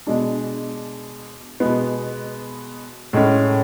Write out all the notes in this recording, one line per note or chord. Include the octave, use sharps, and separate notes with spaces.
B2 G#3 D4
B2 G#3 B3
A2 G#3 C#4